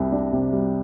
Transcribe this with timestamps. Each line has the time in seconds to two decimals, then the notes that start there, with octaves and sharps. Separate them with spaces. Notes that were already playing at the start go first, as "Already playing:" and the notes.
Already playing: C2 C3 G3
0.12 D4
0.32 C3
0.52 G3